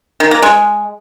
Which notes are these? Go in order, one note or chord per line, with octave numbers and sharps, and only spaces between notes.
D#3
A#3
G#3